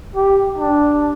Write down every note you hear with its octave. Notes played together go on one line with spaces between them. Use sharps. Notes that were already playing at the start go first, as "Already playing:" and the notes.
G4
D4